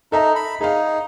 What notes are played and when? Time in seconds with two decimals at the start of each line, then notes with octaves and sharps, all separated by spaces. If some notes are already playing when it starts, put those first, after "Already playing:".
0.12 D#4 A4 E5 A#5
0.36 B5
0.61 D#4 G#4 F5